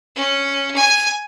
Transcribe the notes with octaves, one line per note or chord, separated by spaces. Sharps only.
C#4
G#5